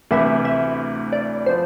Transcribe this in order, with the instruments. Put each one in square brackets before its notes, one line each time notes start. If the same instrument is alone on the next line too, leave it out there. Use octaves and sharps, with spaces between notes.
[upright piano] D2 C3 E3 B3 [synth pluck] E5
[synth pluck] E5
D5
[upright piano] F3 B3 [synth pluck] C5